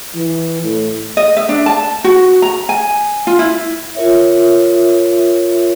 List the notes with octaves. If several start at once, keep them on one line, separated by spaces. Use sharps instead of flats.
E3
A2
D#5
E5
D4
A5
F#4
A#5
G#5
F4
E4
F4 A#4 C#5 E5